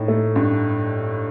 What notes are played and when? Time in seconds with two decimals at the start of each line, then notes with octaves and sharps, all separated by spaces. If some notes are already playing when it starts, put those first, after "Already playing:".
Already playing: A2 D#4
0.08 A3
0.36 G2